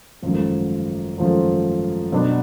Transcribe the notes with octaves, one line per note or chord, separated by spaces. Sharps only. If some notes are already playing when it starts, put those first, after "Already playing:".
G#1 F#2 F3 A3
G#1 F#2 F3 A3
B2 F#3 B3 D4